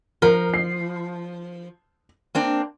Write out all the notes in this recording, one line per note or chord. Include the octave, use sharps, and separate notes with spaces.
F3 A#4
C7
A#3 C4 D4